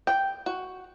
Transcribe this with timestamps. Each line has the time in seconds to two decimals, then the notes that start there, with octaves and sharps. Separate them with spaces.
0.07 G5
0.46 F#4